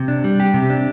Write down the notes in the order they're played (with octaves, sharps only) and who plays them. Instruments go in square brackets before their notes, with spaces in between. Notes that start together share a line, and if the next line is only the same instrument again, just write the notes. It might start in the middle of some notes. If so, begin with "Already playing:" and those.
Already playing: [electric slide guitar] C3
D4
G3
G4
C3
D4